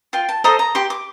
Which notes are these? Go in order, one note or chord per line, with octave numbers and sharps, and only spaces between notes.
F4 G5
A5
A4 C5 D#5 A#5
A#5
G4 C6
D6